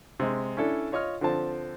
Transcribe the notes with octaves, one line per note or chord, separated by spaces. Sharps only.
C3 G#3
C#4 D4 E4 A4
F4 C#5 D#5 C#6 F6
D3 F3 C4 A5